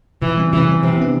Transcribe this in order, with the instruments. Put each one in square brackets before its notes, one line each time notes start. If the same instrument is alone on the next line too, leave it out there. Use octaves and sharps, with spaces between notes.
[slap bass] C3 [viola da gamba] E3
[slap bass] G3 C4
[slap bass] C3 [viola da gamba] E3
[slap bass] G3 C4
[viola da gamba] C3 [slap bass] E3
[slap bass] B3 D4